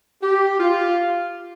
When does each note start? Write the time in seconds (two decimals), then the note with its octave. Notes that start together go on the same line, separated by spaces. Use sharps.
0.23 G4
0.60 F4